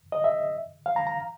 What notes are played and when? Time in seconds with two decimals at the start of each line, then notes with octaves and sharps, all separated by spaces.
0.12 D#5
0.24 E5
0.86 F5
0.96 A#5
1.07 A#5